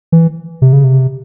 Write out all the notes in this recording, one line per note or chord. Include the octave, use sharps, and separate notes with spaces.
E3
C3
C#3
C3